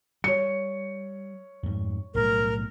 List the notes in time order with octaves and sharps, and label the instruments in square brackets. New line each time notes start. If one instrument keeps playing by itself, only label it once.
[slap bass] G3 [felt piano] C#5 C#7
[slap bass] F2 G#2
[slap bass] B1 A2 G3 [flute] A#4